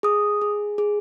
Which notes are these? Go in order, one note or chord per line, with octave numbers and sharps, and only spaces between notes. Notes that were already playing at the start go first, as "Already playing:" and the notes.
G#4 D#6
G#4
G#4